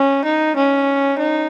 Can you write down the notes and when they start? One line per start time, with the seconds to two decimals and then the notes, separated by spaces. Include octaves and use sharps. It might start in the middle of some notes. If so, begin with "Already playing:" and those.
Already playing: C#4
0.24 D#4
0.56 C#4
1.18 D#4